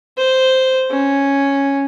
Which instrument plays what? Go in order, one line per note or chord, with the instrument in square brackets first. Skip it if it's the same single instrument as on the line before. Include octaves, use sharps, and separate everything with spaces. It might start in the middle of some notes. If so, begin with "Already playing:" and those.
[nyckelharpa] C5
C#4